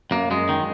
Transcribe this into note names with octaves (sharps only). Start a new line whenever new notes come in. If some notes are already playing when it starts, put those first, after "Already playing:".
F#2 A#3
F#2 G#3
D#3